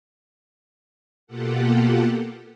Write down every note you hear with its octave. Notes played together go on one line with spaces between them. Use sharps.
B2 A#3 F4 G4 A4 F#5